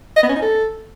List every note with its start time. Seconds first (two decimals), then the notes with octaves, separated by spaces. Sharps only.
0.16 D#5
0.23 B3
0.29 C#4
0.36 D#4
0.42 A4